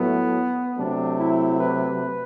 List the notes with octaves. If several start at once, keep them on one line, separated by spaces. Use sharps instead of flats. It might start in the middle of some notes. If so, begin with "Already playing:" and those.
Already playing: A2 F#3 A3 B3
C3 F#3 A3 D4
E4
B4